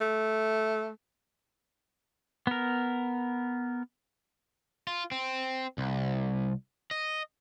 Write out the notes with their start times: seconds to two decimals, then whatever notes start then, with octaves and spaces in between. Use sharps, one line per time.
0.01 A3
2.47 B3 A#4
4.87 F4
5.12 C4
5.78 C2
6.91 D#5